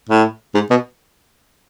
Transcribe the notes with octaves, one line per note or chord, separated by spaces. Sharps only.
A2
G#2
B2